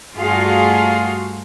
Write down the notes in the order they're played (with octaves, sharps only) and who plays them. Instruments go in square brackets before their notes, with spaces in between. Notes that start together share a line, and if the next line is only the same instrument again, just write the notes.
[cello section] G2 A3 F4 F#4 G#4 F5